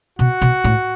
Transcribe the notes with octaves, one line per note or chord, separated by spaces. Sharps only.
B2 F#4
B2
A2